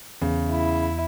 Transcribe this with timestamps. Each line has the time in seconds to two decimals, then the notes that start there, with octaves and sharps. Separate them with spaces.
0.22 E2 C#3
0.50 E4